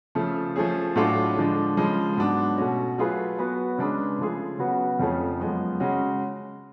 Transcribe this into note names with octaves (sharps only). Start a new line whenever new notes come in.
C#3 F3 A3
F3 A3 C#4 G#4
A2 F#3 A3 D4 F4
D3 F3 G#3 D4
C#3 F3 G#3
G#2 F#3 B3 D4
B2 A3 C#4 F#4
F#3 A3 F4 G#4 B4
F#3 B3 F#4 B4
C#3 G#3 D4 G#4 B4
C#3 F3 A3 F4 G#4
C#3 F#3 B3 F#4 B4
F2 C#3 F3 A3 C#4
F#2 F3 G#3 B3
C#3 G#3 C#4 F#4